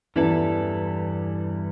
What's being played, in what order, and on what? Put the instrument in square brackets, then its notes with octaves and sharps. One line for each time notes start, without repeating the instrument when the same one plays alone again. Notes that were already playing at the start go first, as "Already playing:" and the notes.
[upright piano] E2 E3 [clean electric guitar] G2 G3 E4 A4